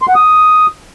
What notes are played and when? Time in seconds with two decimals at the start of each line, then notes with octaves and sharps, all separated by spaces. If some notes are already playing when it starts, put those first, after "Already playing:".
0.02 C6
0.08 F#5
0.15 D#6